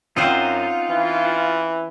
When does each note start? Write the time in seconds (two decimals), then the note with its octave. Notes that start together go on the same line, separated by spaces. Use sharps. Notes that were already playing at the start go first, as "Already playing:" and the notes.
0.16 F#2 C4 C#4 D#4 F4 C5 D#5 F#5
0.90 E3